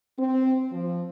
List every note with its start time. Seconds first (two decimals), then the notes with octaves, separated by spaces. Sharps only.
0.18 C4
0.72 F3